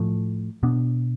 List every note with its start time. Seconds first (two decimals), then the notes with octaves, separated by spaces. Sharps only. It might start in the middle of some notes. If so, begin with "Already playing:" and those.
Already playing: A2 F3 A3
0.63 B2 B3 D4